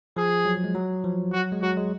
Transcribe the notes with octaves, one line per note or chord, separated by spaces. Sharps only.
F3 G#4
F#3
G#3
F#3
F3
F#3 F#4
G#3
F#3 F#4
G#3